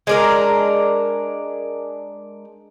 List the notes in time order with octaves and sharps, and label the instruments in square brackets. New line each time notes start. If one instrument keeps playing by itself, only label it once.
[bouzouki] G#3 D4 A#4